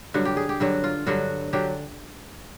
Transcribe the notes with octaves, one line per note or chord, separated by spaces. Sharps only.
G2 D3 F#3 F#4
G4
G#4
G4
G2 D3 F#3 F#4
F4
G2 D3 F#3 F#4
D3 F#3 G4